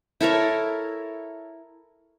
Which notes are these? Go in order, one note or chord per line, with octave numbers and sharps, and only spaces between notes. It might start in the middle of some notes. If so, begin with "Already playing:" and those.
E4 A4 A#4 C#5